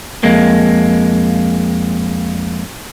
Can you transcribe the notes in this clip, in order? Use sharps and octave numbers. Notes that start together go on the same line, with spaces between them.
F2 G#3 A#3